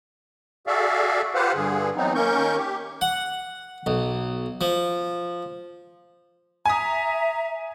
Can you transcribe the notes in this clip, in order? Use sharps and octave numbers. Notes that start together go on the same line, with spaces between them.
F#4 G#4 A4 D5 E5 F5
F4 G4 B4 C5 F5 F#5
G2 D3 G#4
E3 F#3 B3 C4 D#4
D#3 A#3 C#4 A#4 C#6 G6
G4
F#5
B1
F3
E5 G#5 A#5 D#6